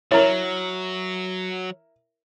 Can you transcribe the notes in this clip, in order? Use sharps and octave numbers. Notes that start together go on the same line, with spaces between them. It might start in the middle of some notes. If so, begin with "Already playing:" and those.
F#3 E4 A#4 C#5